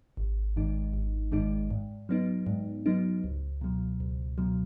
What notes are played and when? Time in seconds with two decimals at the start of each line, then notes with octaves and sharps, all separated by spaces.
0.17 G#1
0.56 G#2 D#3 G#3 D#4
0.93 G#1
1.32 G#2 D#3 G#3 D#4
1.71 G#2
2.09 F#3 B3 D#4
2.47 G#2
2.86 F#3 B3 D#4
3.24 C#2
3.61 B2 F#3
4.00 C#2
4.38 B2 F#3